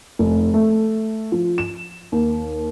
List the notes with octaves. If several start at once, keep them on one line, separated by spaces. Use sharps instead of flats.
F1
A3
F3
E7
D#2